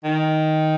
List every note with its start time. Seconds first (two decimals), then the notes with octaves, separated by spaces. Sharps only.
0.05 D#3